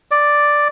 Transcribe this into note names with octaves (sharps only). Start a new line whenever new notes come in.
D5